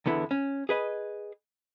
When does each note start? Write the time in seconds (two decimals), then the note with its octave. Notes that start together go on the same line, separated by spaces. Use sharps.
0.06 E2 D3 B3 E4
0.31 C#4
0.69 G#4 B4 D#5